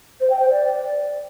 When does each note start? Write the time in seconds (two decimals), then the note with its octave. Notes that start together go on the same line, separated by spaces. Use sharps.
0.20 C5
0.29 G5
0.39 C5
0.48 D5